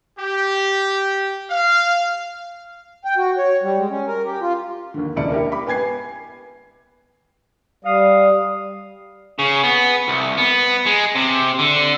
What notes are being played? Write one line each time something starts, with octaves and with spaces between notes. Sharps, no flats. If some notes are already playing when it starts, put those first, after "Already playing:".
G4
F5
G5
F#4
C#5
G3
G#3
C#4
A#4
G4
F4
D#2 D3
D#1 C#2 D4 E4 D5 C#7
E4 G4 A#4
B5 D6
B3 G5 G#5 G#6 C7
G3 F5 D#6
C#3
B3
C2
B3
G#3
C3
D3